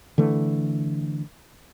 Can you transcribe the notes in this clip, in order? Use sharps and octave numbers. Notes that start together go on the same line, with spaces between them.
D3 E3 A3